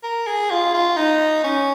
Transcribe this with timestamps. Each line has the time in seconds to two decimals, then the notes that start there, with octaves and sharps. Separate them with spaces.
0.03 A#4
0.27 G#4
0.50 F4
0.74 F4
0.97 D#4
1.44 C#4